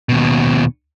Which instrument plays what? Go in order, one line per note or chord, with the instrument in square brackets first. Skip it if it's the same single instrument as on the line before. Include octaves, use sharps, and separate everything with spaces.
[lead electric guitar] D#2 B2